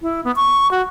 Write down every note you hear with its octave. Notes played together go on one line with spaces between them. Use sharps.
E4
B3
C#6
F#4